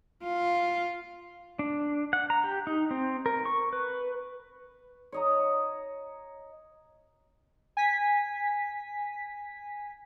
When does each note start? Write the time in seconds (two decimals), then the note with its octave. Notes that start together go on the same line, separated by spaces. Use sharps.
0.24 F4
1.59 D4
2.13 F#5
2.30 A#5
2.44 G4
2.67 D#4
2.91 C4
3.26 A#4
3.45 C#6
3.73 B4
5.12 C#5 D#5 A#5
7.77 G#5 B6